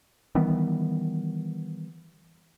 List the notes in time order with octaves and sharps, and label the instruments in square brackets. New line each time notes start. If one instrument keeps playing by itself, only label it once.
[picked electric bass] D#3 E3 G3 B3